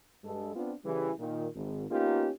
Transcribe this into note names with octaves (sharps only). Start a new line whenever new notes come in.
G2 G#3 A4
B3 C4 D4 F4
C#3 E3 G3
A#2 D#3
G#1
A#3 B3 C#4 D#4 F4 G4